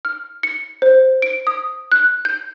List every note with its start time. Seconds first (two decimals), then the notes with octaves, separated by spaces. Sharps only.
0.05 F6
0.43 C#7
0.82 C5
1.22 D7
1.47 D#6
1.92 F#6
2.25 G6